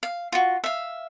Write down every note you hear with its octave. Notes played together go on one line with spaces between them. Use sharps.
F5
F4 F#4
E5 F5